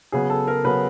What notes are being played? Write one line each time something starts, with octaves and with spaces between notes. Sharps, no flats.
C#3 F#3 B3 G#4
A4
A#4
C#3 F#3 B3 B4